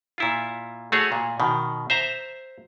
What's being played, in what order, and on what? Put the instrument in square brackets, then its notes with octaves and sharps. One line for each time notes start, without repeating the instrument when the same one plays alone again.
[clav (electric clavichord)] A#2 E4 F4
A3 F#4 G#4 C#5
A#2
B2 D#3
C5 E5 A#5